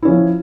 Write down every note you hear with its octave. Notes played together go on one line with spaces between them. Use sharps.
F3 C#4 E4